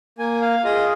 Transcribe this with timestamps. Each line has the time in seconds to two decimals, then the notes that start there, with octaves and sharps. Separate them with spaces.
0.18 A#3 G#5
0.41 F5
0.64 F4 G#4 D#5